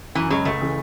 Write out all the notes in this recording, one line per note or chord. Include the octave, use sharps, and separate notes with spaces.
F#2 E3
C#3 F#3 G#3 C#4
C#2 A3
C#3 E3